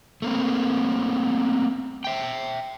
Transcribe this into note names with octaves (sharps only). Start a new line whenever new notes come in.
A3 A#3 C4
E5 G5